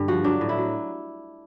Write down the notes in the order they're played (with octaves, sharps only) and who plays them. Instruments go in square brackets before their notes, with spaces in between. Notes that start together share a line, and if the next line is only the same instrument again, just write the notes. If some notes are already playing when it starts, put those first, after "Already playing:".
Already playing: [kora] G2 D3
F3 F#4
F#3 D4
A2
E4
F#3